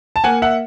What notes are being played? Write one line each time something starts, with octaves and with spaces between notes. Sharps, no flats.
A5
A#3 F#5 G#5
E5 F#5